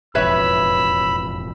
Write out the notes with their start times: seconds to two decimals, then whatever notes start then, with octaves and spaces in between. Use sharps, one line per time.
0.15 E1 A1 F2 B4 C#5 E5 B5 E6